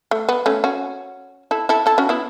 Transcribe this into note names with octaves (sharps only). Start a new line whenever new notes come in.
A3
B3
A3 C#4
C#4 F#4
E4 A4
E4 A4
E4 A4
C#4 F#4
B3 E4